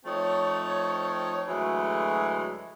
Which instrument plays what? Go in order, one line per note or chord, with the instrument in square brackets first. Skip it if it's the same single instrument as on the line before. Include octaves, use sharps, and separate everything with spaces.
[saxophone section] F3 A3 C4 D#4 C#5
D2 E3 F#3 G#3 A3 G#4